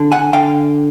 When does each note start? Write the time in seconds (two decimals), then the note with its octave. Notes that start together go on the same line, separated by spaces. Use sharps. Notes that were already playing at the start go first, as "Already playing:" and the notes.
Already playing: D3
0.12 F#5 G#5
0.33 D3 F5 G5